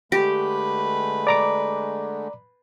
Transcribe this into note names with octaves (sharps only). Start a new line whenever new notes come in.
D3 G#3 A3 G4 B4
D5 A#5 D6